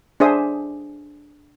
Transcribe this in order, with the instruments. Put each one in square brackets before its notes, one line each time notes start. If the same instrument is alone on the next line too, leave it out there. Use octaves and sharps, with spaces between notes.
[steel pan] D4 G#4 C5 E5 D#6